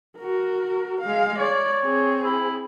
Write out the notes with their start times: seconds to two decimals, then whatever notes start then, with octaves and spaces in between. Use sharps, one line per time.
0.19 F#4 A#4
1.01 G#3 F5
1.39 C#5 D5
1.83 C4 G#4
2.24 E4